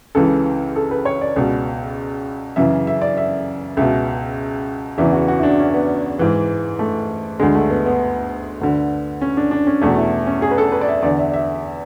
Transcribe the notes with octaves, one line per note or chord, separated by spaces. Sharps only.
C#2 C#3 E3 A4
A4
B4
C#5
D5
C#2 B2
F#2 C#3 E3 E5
E5
D5
E5
C#2 B2 E5
E2 C#3 E3 E5
F#4
F#4
E4
D4
C#4
B3
G#2 E3
A3
D2 D3 G#3
A3
B3
B3
D2 D3
C#4
D4
D4
C#4
E2 B2 A3
E4
C#4
G#4
B4
A4
B4
D5
E5
E2 D3 D5
E5
E5